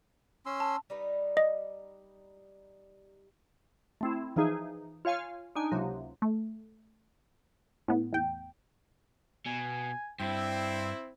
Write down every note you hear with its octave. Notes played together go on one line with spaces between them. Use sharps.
C#4 C6 E6
A5
G3 D#4 B4
D#5
A3 C4 E4
E3 F3 D#4 G#4
F4 C#5 F5 G#5 F6
D4 D#4 G#5
C#2 C3 F#3 A#3
A3
A2 B3
E2 G5
B2 G#5
G2 C4 E4 G5